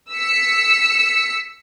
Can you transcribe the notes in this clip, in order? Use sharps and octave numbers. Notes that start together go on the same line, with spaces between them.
E6 B6 C#7